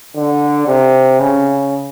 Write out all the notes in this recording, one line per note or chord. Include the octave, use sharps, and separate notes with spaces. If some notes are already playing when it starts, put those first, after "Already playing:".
D3
C3
C#3